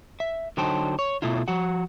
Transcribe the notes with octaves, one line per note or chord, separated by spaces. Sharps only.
E5
D3 F#3 D#4 C5 G5 A5
C#5
B2 A3 E4 F4
F3 F#4 F#5